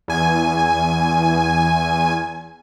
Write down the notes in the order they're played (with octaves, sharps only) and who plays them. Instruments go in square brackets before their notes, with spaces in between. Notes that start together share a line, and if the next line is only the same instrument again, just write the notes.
[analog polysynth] E2 G#5